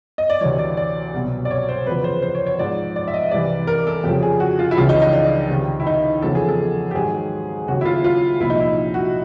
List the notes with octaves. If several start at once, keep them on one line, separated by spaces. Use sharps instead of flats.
D#5
D5
D2 C3 E3 C#5
D5
D5
C2 B2 F#3
D5
C#5
C5
E2 C#3 F3 B4
C5
C5
C#5
C#5
G#2 F3 D5
D5
E5
D#5
C2 C3 E3 D5
A#4
A4
F2 C#3 F3 G4
G#4
F#4
F4
E4
C#2 C#3 E3 F4
D#4
D#4
D4
C#2 C3 D#3
E4
D#4
E2 C#3 F3 A4
G#4
A4
G4
G#2 D#3 F#3 G#4
D#2 C#3 F#3 F#4
E4
F4
F4
C2 A#2 F3 E4
D#4
E4
F#4